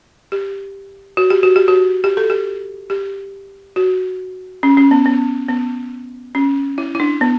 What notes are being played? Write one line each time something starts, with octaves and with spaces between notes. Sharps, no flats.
G4
F#4
G4
F#4
G4
F#4
G4
A4
G4
G4
F#4
C#4
C#4
B3
B3
B3
C#4
E4
E4
D4
B3